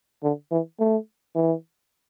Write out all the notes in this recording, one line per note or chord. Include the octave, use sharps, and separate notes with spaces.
D3
E3
A3
E3